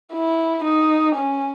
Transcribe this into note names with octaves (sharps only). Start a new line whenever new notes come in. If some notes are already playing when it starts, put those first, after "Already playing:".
E4
D#4
C#4